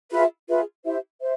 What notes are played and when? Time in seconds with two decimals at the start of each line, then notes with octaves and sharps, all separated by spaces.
0.11 F4 G#4 B4 E5
0.47 F4 G#4 B4 E5
0.84 E4 G4 C5 E5
1.21 C5 E5